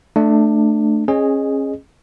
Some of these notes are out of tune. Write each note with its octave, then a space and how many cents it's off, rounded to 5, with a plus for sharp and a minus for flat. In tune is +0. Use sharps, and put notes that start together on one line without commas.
A3 +0 D4 +20
C#4 -30 G#4 +0 D#5 -25